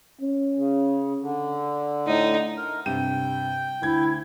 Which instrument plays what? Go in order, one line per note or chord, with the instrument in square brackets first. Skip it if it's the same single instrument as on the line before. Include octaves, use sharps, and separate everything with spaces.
[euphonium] C#4
[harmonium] C#3
D3
[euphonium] A2 [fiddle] D#4
[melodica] A#4
[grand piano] G2 C3 D#7 [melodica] G5
[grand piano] D2 G#6 [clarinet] E4